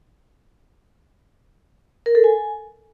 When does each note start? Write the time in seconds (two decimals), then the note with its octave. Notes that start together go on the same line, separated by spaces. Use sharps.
2.06 A#4
2.15 A4
2.24 G#5